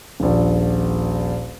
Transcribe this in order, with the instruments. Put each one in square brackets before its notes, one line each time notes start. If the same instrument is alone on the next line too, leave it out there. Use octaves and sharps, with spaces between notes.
[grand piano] D#1 A#1